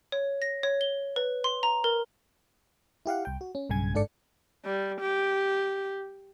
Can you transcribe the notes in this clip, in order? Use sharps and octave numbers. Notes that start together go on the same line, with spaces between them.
C#5
A#6
C#5
G7
B4
C6
A#5
A#4
E4 G4 F5 F#5
C2 G5
F#4
C#4
B1 G2 C#3 G#5 G#6
G1 G#2 D4 A4 D5 C#7
G3
G4